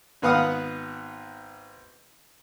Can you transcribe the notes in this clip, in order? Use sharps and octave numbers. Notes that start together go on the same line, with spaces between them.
G#1 B3 B4 F5 F#5 D#6